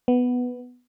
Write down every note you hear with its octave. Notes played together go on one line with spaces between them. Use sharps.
B3